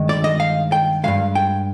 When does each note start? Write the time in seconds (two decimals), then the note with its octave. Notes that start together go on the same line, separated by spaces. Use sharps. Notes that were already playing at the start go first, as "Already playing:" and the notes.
Already playing: G2 D#3 G#3
0.09 D5
0.24 D#5
0.40 F5
0.72 G5
1.03 G2 F3 G#3 F5
1.35 G5